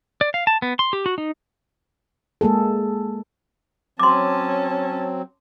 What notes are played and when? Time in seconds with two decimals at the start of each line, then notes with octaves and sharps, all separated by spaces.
0.21 D5
0.34 F5
0.47 A5
0.62 B3
0.79 C6
0.93 G4
1.06 F#4
1.18 D#4
2.41 G#3 A#3 G#4 A4
3.99 F#3 C4 C#4 A5 C6 D6